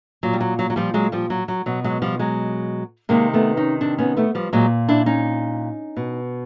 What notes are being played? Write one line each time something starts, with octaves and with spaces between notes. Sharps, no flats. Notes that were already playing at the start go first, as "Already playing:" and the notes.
A#2 F#3
G3
F#3
F#3
F#3
F3 G3
F#3 G#3
F3 G3
F#3
F#3
B2 F#3
F#3 G#3
F3 G3
F#3 G#3
C3 D#3 G#3 A#3
A3 B3
C#4 D#4
C4 D4
B3 C#4
A3 B3
F3 G3
A#2 F#3 G#3
D4 E4
C#4 D#4
B2